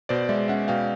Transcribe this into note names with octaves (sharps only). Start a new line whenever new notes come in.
B2 C5 D5
G#3 D5 E5
C#4 E5 F#5
B2 F5 G5